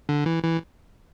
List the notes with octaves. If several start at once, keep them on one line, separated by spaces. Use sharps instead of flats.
D3
E3
E3